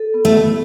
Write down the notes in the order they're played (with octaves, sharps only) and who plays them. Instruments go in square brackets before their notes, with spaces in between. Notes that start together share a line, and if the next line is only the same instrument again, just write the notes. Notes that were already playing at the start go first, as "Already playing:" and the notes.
Already playing: [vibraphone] A4
B3
[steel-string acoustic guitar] A3
[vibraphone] B3